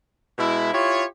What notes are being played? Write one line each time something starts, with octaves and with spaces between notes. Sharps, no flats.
B2 G#3 E4
E4 F4 G4 C#5